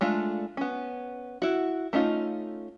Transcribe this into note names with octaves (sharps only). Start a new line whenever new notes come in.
G#3 A3 D4 F4
B3 C#4
E4 F#4
A3 C#4 D#4 F4